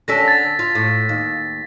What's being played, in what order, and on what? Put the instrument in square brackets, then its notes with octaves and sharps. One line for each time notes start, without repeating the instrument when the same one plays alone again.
[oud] D3 C#4 A4 [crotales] A#6 B6
[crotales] A6
[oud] F4
A2
D#2